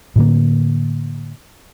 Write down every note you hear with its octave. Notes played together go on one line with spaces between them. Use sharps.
A2 D3 A#3